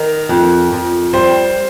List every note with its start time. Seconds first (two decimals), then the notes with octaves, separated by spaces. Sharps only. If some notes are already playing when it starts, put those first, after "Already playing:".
Already playing: D#3 A#4
0.29 F2
0.72 F2
1.13 G3 C5